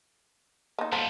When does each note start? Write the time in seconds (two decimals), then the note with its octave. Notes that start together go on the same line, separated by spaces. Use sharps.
0.78 A#3 D#4
0.92 F3 G3 A#3 B3 A4